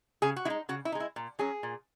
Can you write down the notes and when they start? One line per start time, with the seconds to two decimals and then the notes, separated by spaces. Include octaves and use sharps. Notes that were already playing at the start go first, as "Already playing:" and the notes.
0.22 C#3 G#4
0.36 F#4
0.45 G#3 D#4 E4
0.69 C#3 F#4
0.85 E4
0.92 D#4
0.95 G#3
1.00 E4
1.16 A#2
1.39 F#3 C#4 G#4
1.63 A#2